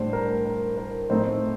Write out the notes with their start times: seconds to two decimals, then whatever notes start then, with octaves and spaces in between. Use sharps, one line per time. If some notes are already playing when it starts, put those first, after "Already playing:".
Already playing: A2 G3 D4 C5
0.13 A#4
0.46 A#4
0.78 A#4
1.10 A2 A3 C4 D#4 C5